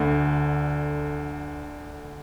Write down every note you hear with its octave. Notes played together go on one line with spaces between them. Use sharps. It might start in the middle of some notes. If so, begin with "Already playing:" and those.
Already playing: D2 D3